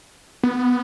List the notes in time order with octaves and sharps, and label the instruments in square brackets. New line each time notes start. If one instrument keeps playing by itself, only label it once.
[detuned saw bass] B3